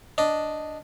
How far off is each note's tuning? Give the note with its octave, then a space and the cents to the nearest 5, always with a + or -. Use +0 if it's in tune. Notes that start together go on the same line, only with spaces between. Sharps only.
D4 +0 D#5 +0